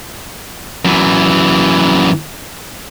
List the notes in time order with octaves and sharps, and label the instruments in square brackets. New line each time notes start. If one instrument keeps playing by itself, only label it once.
[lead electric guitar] F#2 E3